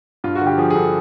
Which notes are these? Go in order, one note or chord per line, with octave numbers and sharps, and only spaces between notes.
G2 F4
F#4
D3
G4
F3 G#4
G#4
G2 A4